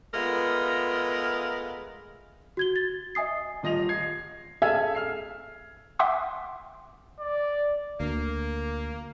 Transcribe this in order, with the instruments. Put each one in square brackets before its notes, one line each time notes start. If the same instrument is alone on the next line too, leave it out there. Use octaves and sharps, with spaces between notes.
[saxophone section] G#3 A3 B3 F4 A#4
[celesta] F#4 G#6 G7
A6
D#5 E5 G#5 D#6 C7
[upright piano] D#1 F4 D#5 A#6 F7
G#6 C7
G#4 A4 E5 G#5 F6 G#6
F6 C7
[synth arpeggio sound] E5 F#5 G5 C6 D6 D#6
[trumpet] D5
[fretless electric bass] D2 [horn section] A#3